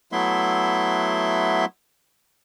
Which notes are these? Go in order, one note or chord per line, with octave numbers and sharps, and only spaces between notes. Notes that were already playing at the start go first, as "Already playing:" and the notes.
F#3 A3 B3 E4 E5 C6